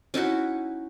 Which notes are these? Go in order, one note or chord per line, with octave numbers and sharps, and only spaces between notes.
C#4 D#4 E4 F#4